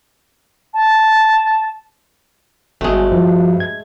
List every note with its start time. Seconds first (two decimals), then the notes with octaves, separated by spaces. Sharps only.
0.74 A5
2.81 G1 G#3 A3 F#4
3.12 G2 F3
3.60 G#6